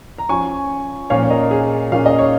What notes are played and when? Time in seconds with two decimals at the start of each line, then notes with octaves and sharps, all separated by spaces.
0.18 A#5
0.29 F3 C#4 G#5 C#6
1.10 A#2 F3 C#4 C#5 F5
1.23 C#5
1.30 A#4 D#5
1.51 G#4
1.92 A#2 A#3 C#4 F5
2.06 D#5
2.19 C#5